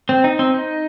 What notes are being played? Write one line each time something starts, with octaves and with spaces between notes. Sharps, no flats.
C4
D#4
C4
D#4